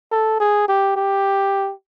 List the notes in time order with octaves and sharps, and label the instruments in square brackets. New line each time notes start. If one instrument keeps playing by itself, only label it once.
[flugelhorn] A4
G#4
G4
G4